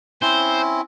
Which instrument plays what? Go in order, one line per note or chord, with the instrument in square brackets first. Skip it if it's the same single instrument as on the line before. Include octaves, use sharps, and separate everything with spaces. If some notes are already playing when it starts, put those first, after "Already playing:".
[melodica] C4 C#4 E4 [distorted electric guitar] C5